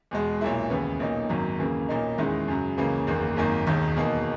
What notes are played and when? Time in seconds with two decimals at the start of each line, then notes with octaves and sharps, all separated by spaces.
0.11 E2 B2 G#3
0.41 B1 A#2 A#3 E4
0.70 D#2 C#3 E3 B3
1.00 B1 A#2 A#3 D#4
1.29 G#1 F#2 D#3 F#3 A#3
1.59 D#2 C#3 E3 A#3
1.89 B1 A#2 A#3 D#4
2.18 E2 D#3 G#3 C#4 E4
2.48 F#2 C#3 F#3
2.77 C#2 C#3 E3 A#3 C#4
3.07 F#1 E2 D#3 A#3
3.37 G#1 F#2 D#3 A#3
3.67 E1 D#2 D#3
3.96 E2 B2 A#3 D#4